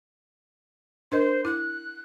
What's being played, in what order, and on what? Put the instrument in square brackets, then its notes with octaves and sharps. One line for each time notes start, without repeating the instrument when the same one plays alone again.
[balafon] D4 A#4 D#5 [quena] C5
[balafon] E4 [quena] F#6